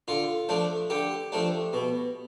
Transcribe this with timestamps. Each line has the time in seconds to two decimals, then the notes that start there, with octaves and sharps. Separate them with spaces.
0.08 D3 F4
0.49 F3 A3 D4
0.90 D3 G4
1.32 F3 A3 D4
1.73 B2